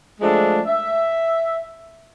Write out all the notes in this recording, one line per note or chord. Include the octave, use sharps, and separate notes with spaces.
F3 G#3 A3 D4
E5